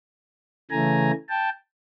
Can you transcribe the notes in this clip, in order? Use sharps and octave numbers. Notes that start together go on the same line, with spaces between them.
C#3 E3 A3 G#5 A#5
G5 A5